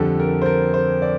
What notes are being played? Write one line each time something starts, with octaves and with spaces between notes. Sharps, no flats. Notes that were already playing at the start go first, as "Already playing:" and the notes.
Already playing: F2 D3 G3 A4
A#4
C5
A#4
C5
D5